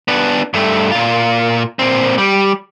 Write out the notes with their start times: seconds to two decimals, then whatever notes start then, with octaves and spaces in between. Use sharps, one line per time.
0.08 B3 D4
0.54 G2 A3
0.92 A#2 F4
1.79 A#2 C4
2.18 G3